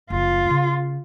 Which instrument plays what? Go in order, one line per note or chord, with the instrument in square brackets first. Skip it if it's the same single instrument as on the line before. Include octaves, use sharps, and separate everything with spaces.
[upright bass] F#1 F3 [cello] F4
[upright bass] C#3 C#4